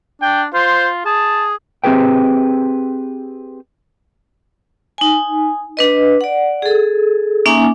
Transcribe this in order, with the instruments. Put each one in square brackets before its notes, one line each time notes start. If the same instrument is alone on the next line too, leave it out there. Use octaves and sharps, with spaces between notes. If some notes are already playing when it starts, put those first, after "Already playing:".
[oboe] D4 [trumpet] G5
[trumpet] F4 [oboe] C5
[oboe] G#4 [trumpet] A5
[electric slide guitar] C4 G4 G#4 B4 G5
[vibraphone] D#4 G#5
D4 B4 D#5
D5 F#5
G#4 A4
A#3 C#4 D#4 E5 G#5 D6